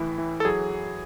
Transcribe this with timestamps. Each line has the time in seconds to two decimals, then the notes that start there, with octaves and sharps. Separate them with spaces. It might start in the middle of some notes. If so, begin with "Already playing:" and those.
Already playing: A2 E3 E4
0.18 E3
0.40 A4
0.45 F#3 G#4